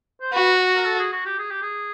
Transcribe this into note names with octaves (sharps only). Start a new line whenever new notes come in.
C5
F#4 B4
A#4
A4
G#4
F#4
G4
G#4
G4
G#4